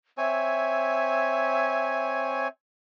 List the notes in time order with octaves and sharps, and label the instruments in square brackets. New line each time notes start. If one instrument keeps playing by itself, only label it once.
[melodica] C4 C#5 G#5 [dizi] E5